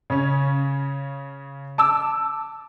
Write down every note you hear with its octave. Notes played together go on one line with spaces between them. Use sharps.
C#3 C#4
A5 D6 E6